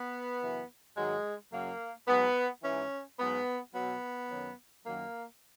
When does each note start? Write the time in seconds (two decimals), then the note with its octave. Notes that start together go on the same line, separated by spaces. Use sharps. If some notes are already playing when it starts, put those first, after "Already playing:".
Already playing: B3
0.41 F#2 C#3 E3
0.96 G#2 D#3 F#3 G#3
1.52 F#2 C#3 F#3 A#3
2.07 G#2 F#3 B3
2.63 G#2 E3 C#4
3.19 G#2 F#3 B3
3.74 B2 F#3 B3
4.30 F#2 D#3 F#3
4.85 F#2 D#3 F#3 A#3